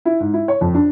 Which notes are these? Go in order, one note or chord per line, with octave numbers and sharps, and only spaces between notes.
E4
G#2
E4
C#5
F2
D4